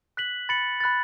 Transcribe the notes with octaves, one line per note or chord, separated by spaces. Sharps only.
F#6 B6 F#7
B5 A6 C#7 F#7
B5 F#6 A6